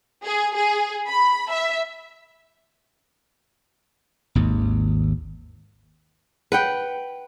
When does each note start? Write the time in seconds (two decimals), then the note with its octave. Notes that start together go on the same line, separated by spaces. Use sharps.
0.24 G#4
0.55 G#4
1.07 B5
1.51 E5
4.35 G#1 D#2
6.52 B4 F#5 G5